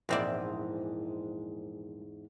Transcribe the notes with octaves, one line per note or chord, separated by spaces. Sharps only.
A#1 E2 G#2 C4 D5 E5